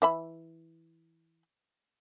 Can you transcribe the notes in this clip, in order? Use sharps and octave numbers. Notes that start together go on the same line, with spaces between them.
E3 E5 B5